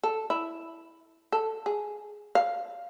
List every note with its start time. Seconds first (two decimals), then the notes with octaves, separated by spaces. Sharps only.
0.04 A4
0.30 E4
1.32 A4
1.66 G#4
2.35 F5